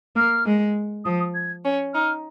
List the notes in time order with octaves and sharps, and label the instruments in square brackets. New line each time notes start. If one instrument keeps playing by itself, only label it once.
[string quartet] A#3 [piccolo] F6
[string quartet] G#3
[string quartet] F3 [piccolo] D#6
[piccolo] D#6
G#6
[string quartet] C#4
[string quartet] D#4 [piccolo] F6